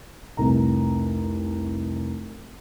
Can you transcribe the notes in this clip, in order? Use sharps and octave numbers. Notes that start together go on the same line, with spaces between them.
F1 C2 A#5